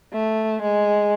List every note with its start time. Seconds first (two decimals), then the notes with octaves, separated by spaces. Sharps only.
0.13 A3
0.62 G#3